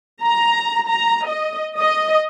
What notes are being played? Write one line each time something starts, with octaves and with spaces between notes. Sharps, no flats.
A#5
A#5
D#5
D#5